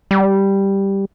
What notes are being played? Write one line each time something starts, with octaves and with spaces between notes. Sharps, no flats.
G3